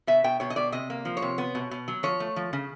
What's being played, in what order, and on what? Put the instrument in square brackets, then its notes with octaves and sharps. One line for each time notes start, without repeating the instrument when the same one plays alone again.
[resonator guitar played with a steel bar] B2 E5
B2 G5
B2 C#5
D#5
B2 D5
C3 D#5
A#3
F3
C#5
C3
B3
B2
B2
F#3
F3 C#5
A3
F3
C#3